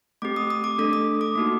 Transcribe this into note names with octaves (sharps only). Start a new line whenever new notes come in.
A3 C4 G4 D6
D#6
D#6
D6
A3 D4 A4 D#6
D#6
D6
A#3 D#4 F#4